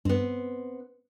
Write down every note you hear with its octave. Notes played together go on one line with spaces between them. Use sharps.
G2 B3 C4